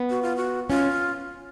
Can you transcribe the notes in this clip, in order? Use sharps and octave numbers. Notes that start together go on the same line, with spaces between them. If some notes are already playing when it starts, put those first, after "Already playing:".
Already playing: B3
F#4
F4
F#4
C#4 F4